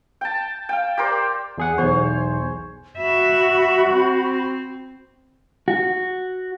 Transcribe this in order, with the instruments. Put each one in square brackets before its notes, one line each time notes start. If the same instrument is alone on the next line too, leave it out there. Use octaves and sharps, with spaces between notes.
[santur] G5 A5
F5 G5
G4 A#4 C5 D5
[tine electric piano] E2 G#4 F#5
[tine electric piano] B1 E2 [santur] C5 C#5 G#5
[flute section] F#4 B5 [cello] E5
[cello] C4
[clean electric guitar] F#4